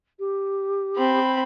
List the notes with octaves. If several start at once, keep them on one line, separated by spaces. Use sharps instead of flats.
G4
C4 B5